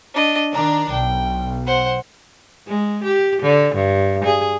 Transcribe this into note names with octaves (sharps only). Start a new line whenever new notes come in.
D4 D#5
D#3 D4 A#5
B1 G5
C5 F#5
G#3
G4
D3
G2
G#4